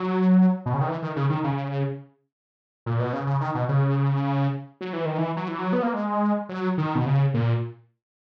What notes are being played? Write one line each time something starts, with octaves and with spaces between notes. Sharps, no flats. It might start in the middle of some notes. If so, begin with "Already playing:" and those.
Already playing: F#3
B2
C#3
D#3
E3
D#3
C#3
D#3
C#3
A#2
B2
C#3
C#3
D#3
B2
C#3
F#3
E3
D#3
E3
F#3
E3
F#3
B3
A#3
G#3
F#3
D#3
B2
C#3
A#2